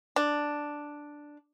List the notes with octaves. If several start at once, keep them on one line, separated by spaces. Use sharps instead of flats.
D4